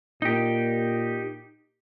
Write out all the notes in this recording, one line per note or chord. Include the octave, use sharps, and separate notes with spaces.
A#2 D#4 G4